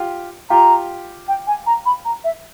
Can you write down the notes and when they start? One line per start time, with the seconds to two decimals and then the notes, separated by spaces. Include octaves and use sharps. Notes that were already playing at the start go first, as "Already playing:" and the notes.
Already playing: F4 G4
0.50 F4 G4 A#5
1.28 G5
1.47 G#5
1.66 A#5
1.86 B5
2.05 A#5
2.24 E5